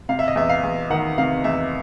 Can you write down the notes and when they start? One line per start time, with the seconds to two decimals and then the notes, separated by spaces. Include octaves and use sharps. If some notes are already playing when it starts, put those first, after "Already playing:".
0.09 C3 F5
0.19 E5
0.28 D#5
0.35 E2 E5
0.49 F5
0.63 E2
0.90 D#3 F#5
1.18 C3 F5
1.44 E2 E5